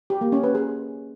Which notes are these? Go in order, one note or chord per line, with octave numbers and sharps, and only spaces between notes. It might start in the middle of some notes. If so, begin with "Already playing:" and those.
G4
A#3
C#4
B4
G#4